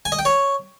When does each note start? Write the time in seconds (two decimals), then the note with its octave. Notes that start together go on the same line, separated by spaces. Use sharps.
0.05 G#5
0.12 D#5
0.19 G5
0.25 C#5